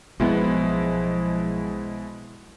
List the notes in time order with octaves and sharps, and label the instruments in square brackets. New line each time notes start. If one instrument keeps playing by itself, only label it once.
[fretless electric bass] B1 B3 [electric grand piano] B2 G#3 E4 [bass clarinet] F3